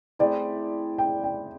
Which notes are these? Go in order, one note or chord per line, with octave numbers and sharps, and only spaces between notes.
A3 C4 E4 G#4 D5
G5
G5